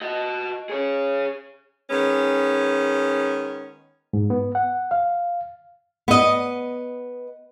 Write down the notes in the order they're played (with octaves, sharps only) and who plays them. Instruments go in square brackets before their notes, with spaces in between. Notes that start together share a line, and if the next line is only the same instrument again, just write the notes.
[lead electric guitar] F#4 D#5
G#4 C#5
[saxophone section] D#3 G#3 B3 C#4
[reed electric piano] G#2
B3
F#5
F5
[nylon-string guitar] B3 D#5